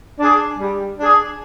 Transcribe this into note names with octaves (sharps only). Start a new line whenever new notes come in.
D4 G#4
G3
D4 G#4